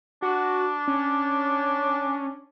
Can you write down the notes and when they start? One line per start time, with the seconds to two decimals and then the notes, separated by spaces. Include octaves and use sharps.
0.22 D4 F#4
0.88 C#4